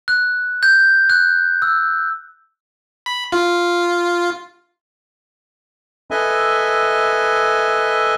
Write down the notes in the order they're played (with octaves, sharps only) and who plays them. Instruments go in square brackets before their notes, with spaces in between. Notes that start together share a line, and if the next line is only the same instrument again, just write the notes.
[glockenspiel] F#6
G6
F#6
E6
[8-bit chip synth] B5
F4
[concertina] A4 B4 D#5 E5 G#5